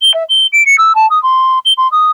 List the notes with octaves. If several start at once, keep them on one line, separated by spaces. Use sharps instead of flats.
G7
E5
G7
D7
C#7
E6
A5
D#6
C6
G7
C6
D#6